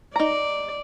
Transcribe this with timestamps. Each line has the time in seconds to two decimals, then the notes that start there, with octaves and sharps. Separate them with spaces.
0.16 D#4 D5 A#5